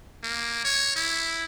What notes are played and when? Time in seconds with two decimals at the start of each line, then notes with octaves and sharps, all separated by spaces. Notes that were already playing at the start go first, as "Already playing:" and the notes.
0.23 A#3
0.64 C#5
0.96 E4